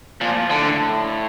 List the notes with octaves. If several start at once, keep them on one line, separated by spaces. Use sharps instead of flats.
A#2 F3
A2 D3